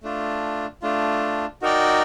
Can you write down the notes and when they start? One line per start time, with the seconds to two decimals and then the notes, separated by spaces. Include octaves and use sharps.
0.03 A3 D4 F4
0.82 A3 D4 F4
1.62 D#4 F#4 A#4 D5 G5